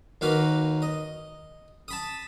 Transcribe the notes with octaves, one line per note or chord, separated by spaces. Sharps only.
D#2 A#3 F#4 B4 F5
D#5
A5 B5 D#6